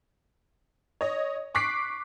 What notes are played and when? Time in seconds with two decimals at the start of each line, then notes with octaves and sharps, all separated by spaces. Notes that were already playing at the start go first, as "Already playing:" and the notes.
1.01 C#5 D#5
1.55 C#6 D6 F#6 B6 C7 D7